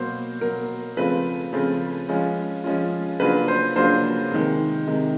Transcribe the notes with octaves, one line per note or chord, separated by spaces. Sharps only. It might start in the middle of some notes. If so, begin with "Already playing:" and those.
Already playing: B2 F#3 A#3 C5
B2 F#3 A#3 A#4
C#3 F3 A3 C4 F4 B4
C#3 F3 A3 C4 F4
F3 G#3 C#4 F4
F3 G#3 C#4 F4
C#3 F#3 A#3 D4 F4 B4
C5
C#3 F#3 A#3 D4 F4 C5
C3 D#3 G#3
C3 D#3 G#3